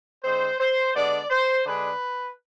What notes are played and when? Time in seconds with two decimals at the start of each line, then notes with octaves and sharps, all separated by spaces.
0.24 D3 G#3 C4 C5
0.60 C5
0.95 D3 G#3 B3 D4 D5
1.30 C5
1.66 D3 G#3 D4 B4